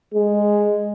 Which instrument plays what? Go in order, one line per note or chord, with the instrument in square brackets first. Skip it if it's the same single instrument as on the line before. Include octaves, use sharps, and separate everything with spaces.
[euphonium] G#3